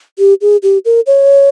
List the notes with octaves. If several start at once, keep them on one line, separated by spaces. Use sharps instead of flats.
G4
G#4
G4
A#4
C#5